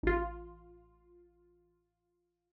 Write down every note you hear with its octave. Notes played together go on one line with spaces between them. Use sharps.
A1 F4